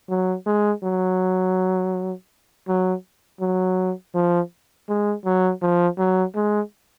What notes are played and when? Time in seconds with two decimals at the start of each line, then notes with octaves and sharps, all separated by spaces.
0.09 F#3
0.46 G#3
0.84 F#3
2.68 F#3
3.40 F#3
4.14 F3
4.89 G#3
5.25 F#3
5.62 F3
5.98 F#3
6.35 G#3